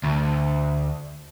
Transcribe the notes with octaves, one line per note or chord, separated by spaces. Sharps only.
D2